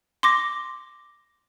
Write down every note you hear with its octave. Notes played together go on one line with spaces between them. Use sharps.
C6 D6 A#6